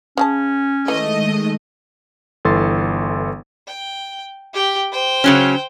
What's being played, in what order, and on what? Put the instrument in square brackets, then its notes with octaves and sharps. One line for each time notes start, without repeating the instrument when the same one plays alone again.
[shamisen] C#3 G#4 A5 [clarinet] C#4
[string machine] D#3 G#3 [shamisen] E3 [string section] A3 D#5
[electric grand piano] G1 E3 A4 C6 A6
[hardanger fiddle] G5
G4 G5
C5 G5
[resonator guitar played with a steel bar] C#3 F#3 C#4